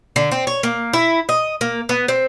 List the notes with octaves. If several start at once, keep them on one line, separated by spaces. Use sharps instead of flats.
D3
C4
C#5
A#3
E4
D#5
A#3
B3
C4